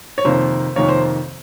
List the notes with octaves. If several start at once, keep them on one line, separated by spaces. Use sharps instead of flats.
C#5
F2 C3 D#3 A#3 C5
F2 C3 D#3 A#3 C#5
C5